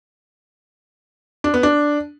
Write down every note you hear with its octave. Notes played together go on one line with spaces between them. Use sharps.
D4
B3
D4